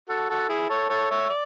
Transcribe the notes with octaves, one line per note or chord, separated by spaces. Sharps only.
F#4 A4
F#4 A4
E4 G#4
A4 C#5
A4 C#5
C#5 E5
D5